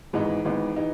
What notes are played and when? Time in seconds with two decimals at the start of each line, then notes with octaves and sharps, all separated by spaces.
0.13 G#1 G#2 E3 B3 D#4
0.45 G#1 G#2 E3 B3 D#4
0.76 E3 B3 D#4